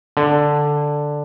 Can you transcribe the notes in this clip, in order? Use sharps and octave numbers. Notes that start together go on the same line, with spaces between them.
D3